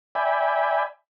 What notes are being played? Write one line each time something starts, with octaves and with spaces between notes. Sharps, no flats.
D5 E5 G5 G#5 B5